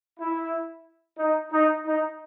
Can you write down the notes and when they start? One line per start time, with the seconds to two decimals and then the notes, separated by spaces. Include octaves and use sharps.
0.19 E4
1.17 D#4
1.51 D#4
1.85 D#4